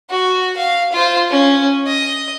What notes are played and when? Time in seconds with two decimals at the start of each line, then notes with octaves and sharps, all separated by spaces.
0.10 F#4
0.57 F5
0.93 F4 C5
1.30 C#4
1.86 D#5